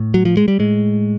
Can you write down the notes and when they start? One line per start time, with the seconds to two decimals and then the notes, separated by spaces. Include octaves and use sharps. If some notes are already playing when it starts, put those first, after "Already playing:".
Already playing: A2
0.14 F#3
0.25 F3
0.37 G#3
0.48 G3
0.59 A2 G#3